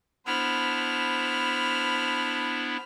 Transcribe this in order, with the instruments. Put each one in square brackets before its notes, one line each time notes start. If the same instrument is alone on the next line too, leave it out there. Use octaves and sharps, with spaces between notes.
[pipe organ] B3 D4 E4 [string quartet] C5 B5 F6